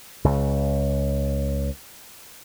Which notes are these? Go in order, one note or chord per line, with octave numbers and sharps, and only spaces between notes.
C#2 C#3